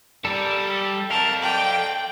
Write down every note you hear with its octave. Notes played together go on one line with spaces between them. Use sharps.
G3 A4 A#4 D5
A4
A4 A#4 F5 A5
D5 G5